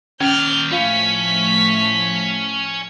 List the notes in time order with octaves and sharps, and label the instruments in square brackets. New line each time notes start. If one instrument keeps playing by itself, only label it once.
[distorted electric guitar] D#2 D5 [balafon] C#4 [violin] F6 G6
[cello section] A2 F3 A3 [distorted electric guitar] C#4 [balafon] F4 F5 [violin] B6